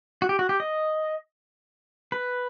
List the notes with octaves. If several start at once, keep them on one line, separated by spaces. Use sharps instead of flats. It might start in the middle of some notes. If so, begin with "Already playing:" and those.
F#4
G4
F#4
G4
D#5
B4